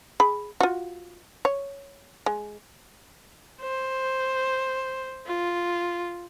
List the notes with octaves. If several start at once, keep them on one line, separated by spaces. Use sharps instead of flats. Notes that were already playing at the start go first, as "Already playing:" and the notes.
G#4 B5
F4 F#4
C#5
G#3
C5
F4